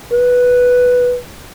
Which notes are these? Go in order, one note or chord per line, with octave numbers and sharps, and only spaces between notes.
B4